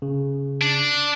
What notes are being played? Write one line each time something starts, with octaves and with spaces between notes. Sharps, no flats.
C#3
D4